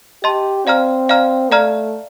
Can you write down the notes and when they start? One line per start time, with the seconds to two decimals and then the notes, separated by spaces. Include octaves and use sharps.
0.23 G4 D#5 A5 C6
0.66 C4 D5 F5 A#5 F6
1.09 D5 F5 A#5 F6
1.51 A3 D5 F5 A#5 F6